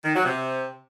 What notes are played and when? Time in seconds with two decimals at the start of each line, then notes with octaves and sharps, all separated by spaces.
0.04 D#3
0.15 F#3
0.25 C3